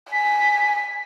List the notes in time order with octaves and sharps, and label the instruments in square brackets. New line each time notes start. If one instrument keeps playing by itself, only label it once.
[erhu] G#5 [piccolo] B6